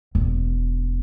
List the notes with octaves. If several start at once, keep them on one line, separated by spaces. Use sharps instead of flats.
E1